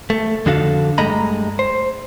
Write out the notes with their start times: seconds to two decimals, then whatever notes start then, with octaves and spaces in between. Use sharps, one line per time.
0.10 A3
0.46 F2 D3 D4 F#4 A4 F5
0.98 G2 G#3 A3 D#5 A#5 B5
1.59 C5